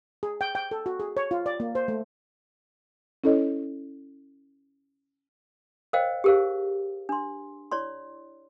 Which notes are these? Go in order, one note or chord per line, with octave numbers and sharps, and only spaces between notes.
G#4
G5
G5
A4
F#4
G#4
C#5
F4
D5
A#3
C5
A3
C#4 E4 A4 C#5 D#5
A#4 C5 C#5 D#5 F5 G5
G4 G#4 A#4 C5 F5
D4 C6
E4 C#5 D5 C6